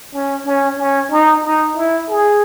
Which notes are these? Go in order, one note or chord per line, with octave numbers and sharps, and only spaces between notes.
C#4
C#4
C#4
D#4
D#4
E4
G#4